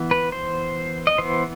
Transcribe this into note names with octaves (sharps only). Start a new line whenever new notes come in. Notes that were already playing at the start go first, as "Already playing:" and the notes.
Already playing: E3 B3
B4
C5
D#5
E3 B3 C5